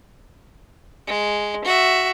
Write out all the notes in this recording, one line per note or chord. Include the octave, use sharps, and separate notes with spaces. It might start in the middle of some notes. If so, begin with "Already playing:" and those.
G#3
F#4 E5